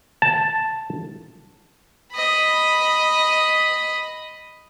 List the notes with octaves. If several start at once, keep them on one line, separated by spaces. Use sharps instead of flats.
A5
D#5 B5